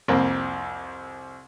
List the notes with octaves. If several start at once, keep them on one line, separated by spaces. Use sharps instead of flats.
C2 F2 A#3 C4